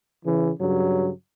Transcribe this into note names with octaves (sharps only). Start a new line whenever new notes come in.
C#3 E3
G2 C#3 F#3